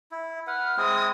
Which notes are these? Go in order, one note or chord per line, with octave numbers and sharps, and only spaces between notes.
E4
B4 F#5 F6
G#3 C4 E4 D#6